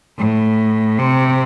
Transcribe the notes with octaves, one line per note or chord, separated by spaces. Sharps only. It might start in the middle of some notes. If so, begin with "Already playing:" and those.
A2
C3